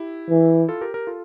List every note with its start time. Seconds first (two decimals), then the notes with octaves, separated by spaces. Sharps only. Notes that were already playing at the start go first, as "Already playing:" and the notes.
Already playing: E4 G4
0.30 E3
0.69 F4 A4
0.81 G4 A#4
0.94 G4 A#4
1.07 F4 A4